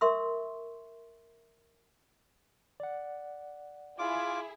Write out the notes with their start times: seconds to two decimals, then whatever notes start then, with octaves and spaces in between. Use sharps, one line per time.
0.01 A#4 E5 C6 C#6 E6
2.80 D5 F#5
3.99 E4 F4 G#4 D6